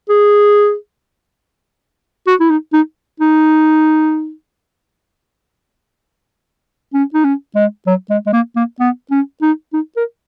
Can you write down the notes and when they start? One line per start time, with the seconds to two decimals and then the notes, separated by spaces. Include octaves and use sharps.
0.09 G#4
2.27 F#4
2.40 E4
2.50 D#4
2.73 D#4
3.20 D#4
6.94 C#4
7.14 D#4
7.24 C#4
7.56 G#3
7.87 F#3
8.10 G#3
8.26 G#3
8.33 A#3
8.56 A#3
8.80 B3
9.11 C#4
9.42 D#4
9.73 D#4
9.96 A#4